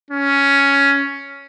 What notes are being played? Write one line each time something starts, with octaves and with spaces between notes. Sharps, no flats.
C#4